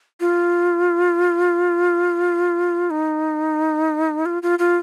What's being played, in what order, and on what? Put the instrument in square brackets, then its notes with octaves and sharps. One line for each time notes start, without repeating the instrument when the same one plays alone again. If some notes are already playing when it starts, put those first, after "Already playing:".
[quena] F4
D#4
F4
F4
F4